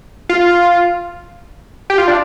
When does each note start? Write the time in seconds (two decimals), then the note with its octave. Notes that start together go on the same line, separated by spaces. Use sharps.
0.29 F4
1.90 G4
1.98 F4
2.08 D4